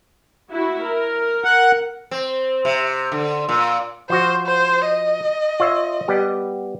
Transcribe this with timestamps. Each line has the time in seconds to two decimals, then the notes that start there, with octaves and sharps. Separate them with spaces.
0.51 E4 F#4
0.85 A#4
1.44 F#5
2.11 C4
2.65 C3
3.12 D3
3.49 A#2
4.10 F3 F#4 C5
4.46 C5
4.85 D#5
5.60 F4 C#5 E5
6.08 G3 B3 G4